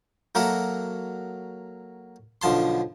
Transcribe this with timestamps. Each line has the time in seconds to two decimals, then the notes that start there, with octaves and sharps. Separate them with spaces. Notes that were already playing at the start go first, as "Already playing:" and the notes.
0.35 F#3 A#3 F#4 A4 A#4 E5
2.42 B1 D3 F3 A5 C6